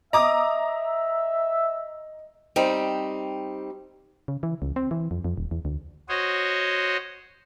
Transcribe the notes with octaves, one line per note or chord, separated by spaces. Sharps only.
D#5 E5 A#5 D6 D#6
G3 C4 D#4
C#3
E3
C#2
C4
E3
F2
F2
D#1
E2
D2
F#4 C5 C#5 D#5